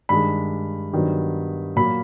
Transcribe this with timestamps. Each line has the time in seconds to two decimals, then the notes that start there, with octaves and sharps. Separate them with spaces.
0.09 G2 D#3 G#3 B5
0.93 G2 D#3 F#3 B3
1.76 A#2 F#3 A#3 B5